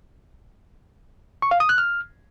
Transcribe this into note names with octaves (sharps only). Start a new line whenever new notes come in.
C#6
F5
D#6
F#6
F6